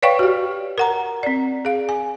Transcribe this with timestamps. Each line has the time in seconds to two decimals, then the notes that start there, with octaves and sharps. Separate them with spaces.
0.02 B4 C#5 D5 F5 G5 C#6
0.19 F#4 G4
0.78 A#4 F#5 A#5
1.23 C4 D5
1.65 G#4 F5
1.89 G#5